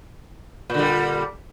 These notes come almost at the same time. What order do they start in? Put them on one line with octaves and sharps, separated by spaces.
A#2 D3 G3